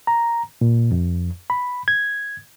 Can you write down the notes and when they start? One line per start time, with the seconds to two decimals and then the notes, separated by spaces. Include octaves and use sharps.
0.07 A#5
0.61 A#2
0.92 F2
1.50 B5
1.88 G#6